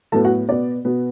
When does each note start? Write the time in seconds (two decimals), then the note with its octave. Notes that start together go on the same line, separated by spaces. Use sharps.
0.12 A2 F#3 B3 A4 A5
0.25 F#4 F#5
0.48 B2 B3 D5
0.85 B2 B3